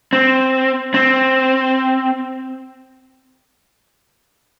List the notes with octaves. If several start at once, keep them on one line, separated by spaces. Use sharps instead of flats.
C4
C4